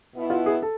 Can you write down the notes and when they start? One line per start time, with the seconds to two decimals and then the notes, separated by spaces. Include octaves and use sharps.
0.15 B2 B3 E4
0.30 F4
0.46 G#4
0.62 A4